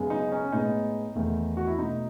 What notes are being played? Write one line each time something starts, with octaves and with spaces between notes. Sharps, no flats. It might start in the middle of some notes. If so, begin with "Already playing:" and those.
Already playing: F#2 C#3 G#3 B3
D#4
C#4
A2 G#3 B3 D#4
E2 D#3 A3
F#4
E4
B2 A3 D#4